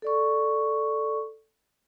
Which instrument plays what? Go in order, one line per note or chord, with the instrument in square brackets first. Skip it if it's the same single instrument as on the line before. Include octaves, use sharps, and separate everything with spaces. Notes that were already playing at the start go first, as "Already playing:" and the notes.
[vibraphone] A4 D5 C#6